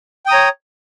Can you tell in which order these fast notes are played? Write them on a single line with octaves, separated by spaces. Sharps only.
G5 D#6 A#5 C#5